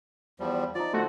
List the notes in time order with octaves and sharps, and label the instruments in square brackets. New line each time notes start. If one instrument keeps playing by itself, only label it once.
[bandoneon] E2 F3 G3
[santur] F3 D#4 [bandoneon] D5
[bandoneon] D3 [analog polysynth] A3 F#4 [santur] C5